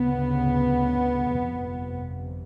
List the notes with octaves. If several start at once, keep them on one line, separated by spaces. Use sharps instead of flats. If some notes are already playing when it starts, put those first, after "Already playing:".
Already playing: D2 C#3 B3
G1 F2 C3